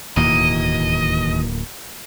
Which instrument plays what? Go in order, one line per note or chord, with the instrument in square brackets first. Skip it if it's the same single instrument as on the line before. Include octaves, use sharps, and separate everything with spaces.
[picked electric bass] D1 A#3 [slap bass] D#2 B2 E3 [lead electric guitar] D#5